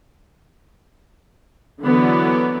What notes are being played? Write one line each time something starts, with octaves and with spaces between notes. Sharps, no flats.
D3 E3 F#3 B3 D5